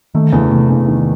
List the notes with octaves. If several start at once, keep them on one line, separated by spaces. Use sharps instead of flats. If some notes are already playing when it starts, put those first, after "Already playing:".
D#3 A3
E2 C#3
C3 A3
E2
D#3